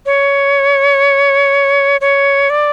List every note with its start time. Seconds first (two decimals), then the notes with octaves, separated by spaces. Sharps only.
0.06 C#5
2.01 C#5
2.50 D5